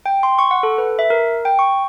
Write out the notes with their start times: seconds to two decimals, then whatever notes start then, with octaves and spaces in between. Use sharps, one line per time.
0.06 G5
0.23 C6
0.39 C#6
0.51 F#5
0.63 A4
0.78 B4
0.99 E5
1.10 A#4
1.45 G5
1.59 C#6